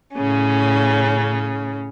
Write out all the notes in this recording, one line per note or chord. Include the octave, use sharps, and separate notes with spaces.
A2 C#3 C#4